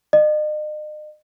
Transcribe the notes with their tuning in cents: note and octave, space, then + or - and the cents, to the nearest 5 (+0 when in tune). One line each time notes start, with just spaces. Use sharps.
D#5 -40